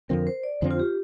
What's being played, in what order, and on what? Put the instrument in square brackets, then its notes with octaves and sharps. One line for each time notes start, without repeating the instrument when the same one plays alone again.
[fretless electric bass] F2 D3 F3 C4 [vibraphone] A#4
[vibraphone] C5
D5
[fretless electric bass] F2 D3 F3 C4 [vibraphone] C5
[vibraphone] F4
G4